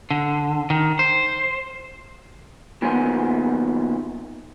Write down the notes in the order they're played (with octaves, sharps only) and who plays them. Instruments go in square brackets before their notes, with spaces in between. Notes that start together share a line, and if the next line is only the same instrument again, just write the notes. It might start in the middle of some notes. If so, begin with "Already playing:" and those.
[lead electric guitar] D3
D#3
C5
[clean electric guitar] A#2 D#3 F#3 B3 C5 G#5